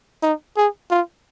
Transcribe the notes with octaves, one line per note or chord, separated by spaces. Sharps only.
D#4
G#4
F4